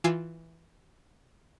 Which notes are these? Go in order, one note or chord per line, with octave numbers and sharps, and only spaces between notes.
E3 F4 G#5 D6 E6 C7